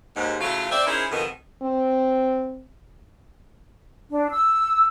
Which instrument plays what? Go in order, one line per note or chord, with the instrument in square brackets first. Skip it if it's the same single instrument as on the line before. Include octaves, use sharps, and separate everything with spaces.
[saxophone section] D#2 G#2
A2 C#3 F#3 A3 F4
C4 D5 E5
C#4 D#4 E4 G#4 A#4 C5
F2 B2 D#3
[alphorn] C4
[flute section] D4
E6